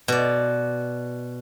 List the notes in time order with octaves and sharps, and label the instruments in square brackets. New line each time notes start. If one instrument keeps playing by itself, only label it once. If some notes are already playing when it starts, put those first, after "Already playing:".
[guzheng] B2 D5